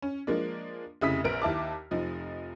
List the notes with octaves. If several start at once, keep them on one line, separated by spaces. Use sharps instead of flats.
C#4
F3 G#3 A#3 D4
F1 C#3 E4 D#6 B6
A#1 A#4 B4 F6 D7
D#2 E4 A5 D6
F1 F3 D#4